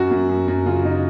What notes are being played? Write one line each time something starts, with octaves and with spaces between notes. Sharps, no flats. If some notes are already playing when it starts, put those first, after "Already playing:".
Already playing: F#2 F#4
F#2
F#2
F#2
C#3 F4
C#3 D#4